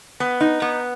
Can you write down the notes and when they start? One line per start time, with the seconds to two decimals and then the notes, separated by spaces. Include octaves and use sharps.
0.20 B3
0.41 D#4
0.62 B3